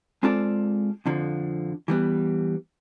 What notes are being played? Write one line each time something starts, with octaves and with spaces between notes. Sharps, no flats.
G#3 C4 F4 A4 D5
F2 D3 F3
E3 G3 B3